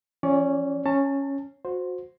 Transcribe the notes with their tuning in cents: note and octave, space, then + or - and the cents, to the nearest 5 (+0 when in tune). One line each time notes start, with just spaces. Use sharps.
F3 -30 C#4 -10 D5 -35
C#4 -5 A5 +25
F#4 -25 C5 +0